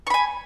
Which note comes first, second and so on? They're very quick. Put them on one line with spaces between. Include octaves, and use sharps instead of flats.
C#6 B5 G#5